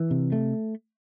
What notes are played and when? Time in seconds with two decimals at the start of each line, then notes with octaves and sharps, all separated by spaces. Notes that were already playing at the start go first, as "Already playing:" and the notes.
Already playing: E3
0.11 C3
0.32 A3